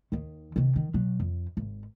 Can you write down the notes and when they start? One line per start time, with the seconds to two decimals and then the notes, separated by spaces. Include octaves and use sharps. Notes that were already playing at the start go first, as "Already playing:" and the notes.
0.12 D#2 D#3
0.56 C3 D#3
0.76 D#3
0.94 B2 F#3
1.20 F2
1.57 G#1